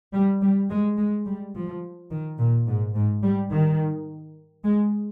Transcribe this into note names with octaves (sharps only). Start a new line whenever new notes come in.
G3
G3
G#3
G#3
G3
F3
D#3
A#2
G#2
G#2
G3
D#3
G#3